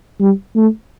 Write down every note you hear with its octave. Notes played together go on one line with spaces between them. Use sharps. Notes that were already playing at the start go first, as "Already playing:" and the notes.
G3
A3